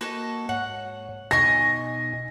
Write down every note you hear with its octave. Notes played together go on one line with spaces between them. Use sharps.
A#3 F#4 A4 D#5
G#2 C#5 F#5
B2 D#4 D#5 G#5 C#6 A#6